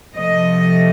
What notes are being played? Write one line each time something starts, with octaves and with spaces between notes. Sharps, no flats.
C3 F3 A3 D#5